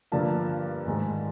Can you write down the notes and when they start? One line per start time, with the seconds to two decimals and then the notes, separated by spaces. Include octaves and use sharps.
0.12 G2 D3 F3 A#3 A5
0.86 G#2 D#3 G#3